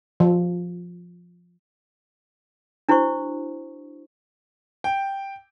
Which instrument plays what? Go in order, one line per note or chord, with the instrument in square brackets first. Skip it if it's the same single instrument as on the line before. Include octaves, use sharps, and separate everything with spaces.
[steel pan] F3
[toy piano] D4 E4 F#4 C5 C#6
[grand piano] G5